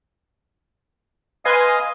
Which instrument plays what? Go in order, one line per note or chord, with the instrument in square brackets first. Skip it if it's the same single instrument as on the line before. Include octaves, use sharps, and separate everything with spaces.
[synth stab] B4 G#5 C6 [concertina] D#5 F5 D#6